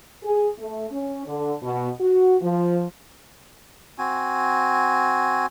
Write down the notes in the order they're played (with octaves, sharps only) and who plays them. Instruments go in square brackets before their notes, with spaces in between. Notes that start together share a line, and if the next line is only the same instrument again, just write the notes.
[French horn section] G#4
A3
C#4
D3
B2
F#4
F3
[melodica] C4 F#4 G#5